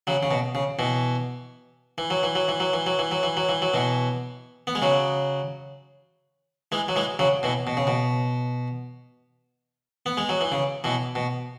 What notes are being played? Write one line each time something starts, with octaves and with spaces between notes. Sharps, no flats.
C#3 F#3
C#3
B2
C#3
B2 E3
E3
F#3
E3
F#3
E3
F#3
E3
F#3
E3
F#3
E3
F#3
E3
F#3
B2 E3
B3
G#3
C#3 F#3
E3 G#3
F#3
E3 G#3
C#3 F#3
B2 E3
B2
C#3
B2
B3
G#3
F#3
E3
C#3
B2 E3
B2